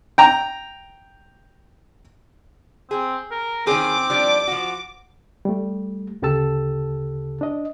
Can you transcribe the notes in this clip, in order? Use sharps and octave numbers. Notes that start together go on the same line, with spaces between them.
G5 A#5
C4 G#4
A#4
D#3 C4 C#4 G#4 D6
F3 G3 D4
F3 F#4
G3 A3
D2 C#3 G4 A4 A5 E6
D4 D#5